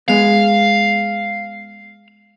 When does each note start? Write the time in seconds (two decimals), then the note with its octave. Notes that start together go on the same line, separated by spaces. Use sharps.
0.08 G#3 B3 F5